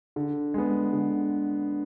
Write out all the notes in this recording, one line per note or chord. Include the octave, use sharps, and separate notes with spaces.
D3
G#3 B3
D3